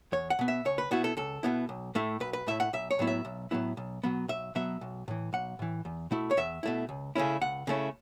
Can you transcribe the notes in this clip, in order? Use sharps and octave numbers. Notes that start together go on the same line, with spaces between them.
E2 C#5
F#5
B2 B3
E5
C#2 C#5
B4
B2 B3 E4 F#4
A4
C#2 A4
B2 B3 E4
B1
A2 A3 E4
B1 B4
B4
A2 A3 E4 E5
F#5
B1 E5
C#5
A2 F#3 B3 E4
E5
B1
A2 F#3 B3 E4
B1
B2 F#3 B3
B1 E5
B2 F#3 B3 E5
B1
A2 E3
B1 F#5
A2 E3
E2
B2 A3 E4
C#5
E2 E5
B2 A3 E4
C#2
C#3 A3 C#4 E4
C#2 F#5
C#3 A3 C#4 E4